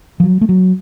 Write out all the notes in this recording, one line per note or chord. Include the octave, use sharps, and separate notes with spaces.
F3
F#3
A3
F#3